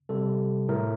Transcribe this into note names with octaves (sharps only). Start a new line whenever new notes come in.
C3 G3 A4
A2 A3 A#4